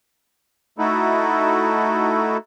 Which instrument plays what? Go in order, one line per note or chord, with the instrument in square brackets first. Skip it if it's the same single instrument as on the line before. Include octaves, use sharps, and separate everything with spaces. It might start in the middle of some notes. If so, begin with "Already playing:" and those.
[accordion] A3 D#4 E4 F#4 A4